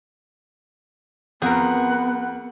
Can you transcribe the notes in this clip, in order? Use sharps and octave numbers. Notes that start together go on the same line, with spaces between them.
F2 B3 G#4 A#4 F#5